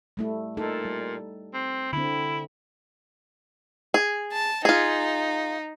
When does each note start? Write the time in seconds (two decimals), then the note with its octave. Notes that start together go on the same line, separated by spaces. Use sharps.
0.17 G3 A3 E4
0.57 A#2 D#4 A4
0.85 G3
1.54 C4
1.93 D3 C4 E4
3.94 G#4
4.33 A5
4.65 D#4 F4 G#4